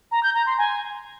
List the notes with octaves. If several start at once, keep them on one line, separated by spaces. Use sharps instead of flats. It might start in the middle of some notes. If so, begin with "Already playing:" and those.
A#5
G6
A#5
C6
G#5